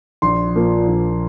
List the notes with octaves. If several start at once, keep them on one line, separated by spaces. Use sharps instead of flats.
A#1 C6
A#2 F3 A#3
A#1